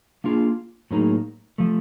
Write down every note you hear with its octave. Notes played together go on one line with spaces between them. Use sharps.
A#3 D4 F4 G#4
A2 F#3 A#3 D#4 G#4
F3 A3